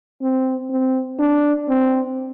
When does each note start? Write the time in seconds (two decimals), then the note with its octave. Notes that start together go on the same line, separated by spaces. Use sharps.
0.22 C4
0.70 C4
1.19 D4
1.68 C4